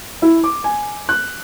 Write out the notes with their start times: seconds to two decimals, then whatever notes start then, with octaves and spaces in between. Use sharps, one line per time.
0.22 E4
0.44 D6
0.64 G#5
1.09 F#6